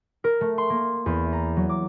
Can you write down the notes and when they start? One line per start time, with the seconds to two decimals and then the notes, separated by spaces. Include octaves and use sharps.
0.24 A#4
0.41 A3
0.58 C6
0.70 A#3
1.06 E2
1.33 A#5
1.57 F#3
1.69 D6